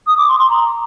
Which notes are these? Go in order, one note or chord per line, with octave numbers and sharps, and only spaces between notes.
D#6
D6
C6
C6
A#5